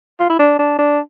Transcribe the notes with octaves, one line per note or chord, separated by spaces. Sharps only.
F4
E4
D4
D4
D4